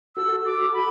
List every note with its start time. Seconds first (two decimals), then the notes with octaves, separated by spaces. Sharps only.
0.16 F#4 A4 E6
0.46 D6
0.74 B5